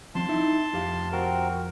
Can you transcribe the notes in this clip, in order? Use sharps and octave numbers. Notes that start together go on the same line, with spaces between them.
F3 C4 A5 C6
D#4 E4 E5
F2 G4 F5
C4 F#4 A#4